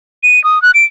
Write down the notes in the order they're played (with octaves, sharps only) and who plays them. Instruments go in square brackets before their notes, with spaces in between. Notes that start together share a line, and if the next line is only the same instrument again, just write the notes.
[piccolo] D#7
D#6
F#6
D7